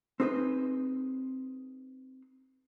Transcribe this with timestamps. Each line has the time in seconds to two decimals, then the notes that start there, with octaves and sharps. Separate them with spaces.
0.20 C4 D#4 G#4 B4 C5